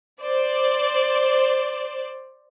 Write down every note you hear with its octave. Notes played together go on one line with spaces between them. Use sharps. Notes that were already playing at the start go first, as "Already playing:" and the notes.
C5 D5